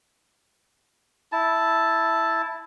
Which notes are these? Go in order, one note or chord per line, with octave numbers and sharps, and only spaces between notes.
E4 A5